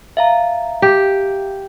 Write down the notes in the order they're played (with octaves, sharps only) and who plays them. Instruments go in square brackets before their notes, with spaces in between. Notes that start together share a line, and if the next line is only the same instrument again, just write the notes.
[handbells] E5 F5 A#5
[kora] G4